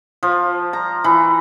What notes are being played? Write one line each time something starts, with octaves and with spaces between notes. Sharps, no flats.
F3
A#5
E3